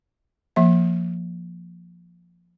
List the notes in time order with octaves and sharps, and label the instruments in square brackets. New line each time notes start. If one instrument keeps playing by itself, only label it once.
[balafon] F3 A#3 E5